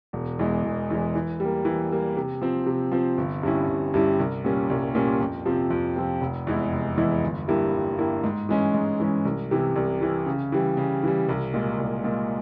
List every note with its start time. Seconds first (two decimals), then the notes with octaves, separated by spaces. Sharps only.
0.13 E1
0.39 E2 E3 G#3
0.64 E1
0.90 E2 E3 G#3
1.15 E3
1.40 G3 A#3
1.65 E3
1.91 G3 A#3
2.17 C3
2.42 F3 C4
2.66 C3
2.92 F3 C4
3.18 G1
3.43 G2 G3 C#4 E4
3.68 G1
3.94 G2 G3 C#4 E4
4.19 C2
4.44 A#2 G3 C#4
4.70 C2
4.95 A#2 G3 C#4
5.20 F2
5.45 C3 F3 C4
5.70 F2
5.96 C3 F3 C4
6.21 F1
6.47 E2 E3 G#3 E4
6.72 F1
6.97 E2 E3 G#3 E4
7.23 G1
7.48 G2 G3 A#3 E4
7.73 G1
7.98 G2 G3 A#3 E4
8.24 G#2
8.49 E3 G#3 C#4
8.74 G#2
9.00 E3 G#3 C#4
9.25 C2
9.51 C3 E3
9.76 C2
10.01 C3 E3
10.26 C#3
10.52 E3 G3
10.77 C#3
11.03 E3 G3
11.29 C2
11.54 A#2 G#3
11.78 C2
12.04 A#2 G#3